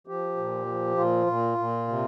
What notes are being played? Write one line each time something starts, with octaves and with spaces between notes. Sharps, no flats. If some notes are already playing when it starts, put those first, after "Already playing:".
F3 G4
A#2
F3
A#2 F4
A#2
A#2
C3